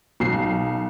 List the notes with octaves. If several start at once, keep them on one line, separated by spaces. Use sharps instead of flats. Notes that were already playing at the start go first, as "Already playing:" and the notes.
B1 C7